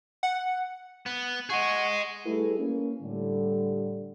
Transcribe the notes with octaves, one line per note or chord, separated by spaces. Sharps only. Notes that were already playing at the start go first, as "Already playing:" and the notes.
F#5
B3
G#4 D#5 F#5 C#6
G3 A3 E4 G#4 A4 B4
A#3 C#4
A2 D3 G3